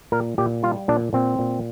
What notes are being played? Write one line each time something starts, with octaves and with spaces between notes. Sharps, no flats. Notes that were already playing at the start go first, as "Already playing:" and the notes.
A#2 A#4
A#2 G4
G3 F4
A#2 D4
A#2 C4
A#2